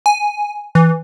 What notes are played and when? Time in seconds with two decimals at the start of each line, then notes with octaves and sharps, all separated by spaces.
0.06 G#5
0.75 E3